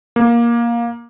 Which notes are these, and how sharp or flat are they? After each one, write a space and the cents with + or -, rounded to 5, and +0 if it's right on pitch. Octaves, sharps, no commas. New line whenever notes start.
A#3 +15